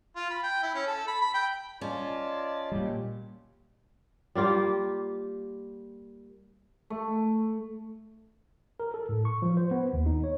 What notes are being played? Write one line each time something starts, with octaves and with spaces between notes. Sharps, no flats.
F4
B5
G5
E4
C#4
A4
B5
B5
G5
C#4 F4 D5 D#5 A5
A#2 G3
G3 A#3 F4 G4
A3
A#4
A4
A2
C#6
F3
C5
B3
D#2
D#4
C#5